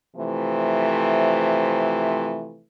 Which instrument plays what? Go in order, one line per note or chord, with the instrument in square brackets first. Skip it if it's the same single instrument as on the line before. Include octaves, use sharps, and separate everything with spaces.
[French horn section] C3 E3 F3 A3